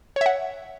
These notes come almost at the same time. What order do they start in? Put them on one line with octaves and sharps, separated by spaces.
C#5 E5 F#5